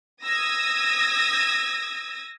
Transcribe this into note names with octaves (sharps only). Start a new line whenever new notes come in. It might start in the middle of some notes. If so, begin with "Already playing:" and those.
D#6 E6 G#6 A#6